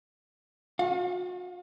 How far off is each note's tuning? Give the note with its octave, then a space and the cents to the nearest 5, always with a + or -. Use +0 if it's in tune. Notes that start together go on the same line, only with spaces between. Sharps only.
F#4 -45 F5 +25